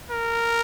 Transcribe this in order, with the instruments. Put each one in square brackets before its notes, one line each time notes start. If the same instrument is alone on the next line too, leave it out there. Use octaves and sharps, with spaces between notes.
[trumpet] A#4